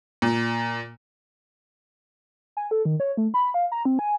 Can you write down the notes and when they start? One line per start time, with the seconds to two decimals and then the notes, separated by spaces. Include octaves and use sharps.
0.22 A#2
2.57 G#5
2.71 A4
2.85 D#3
3.00 C#5
3.17 A3
3.34 B5
3.54 F5
3.72 A#5
3.85 C4
3.99 G#5